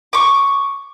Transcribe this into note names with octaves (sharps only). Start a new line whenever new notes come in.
C#6 D6